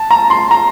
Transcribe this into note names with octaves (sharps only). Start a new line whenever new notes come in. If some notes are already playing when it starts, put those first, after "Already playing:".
Already playing: A5
A#5
C6
A#5